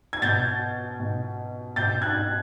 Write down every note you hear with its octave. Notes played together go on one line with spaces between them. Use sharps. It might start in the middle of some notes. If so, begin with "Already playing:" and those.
G#6
B2 G6 A6
B2
B2 G6 A6
F#6 G#6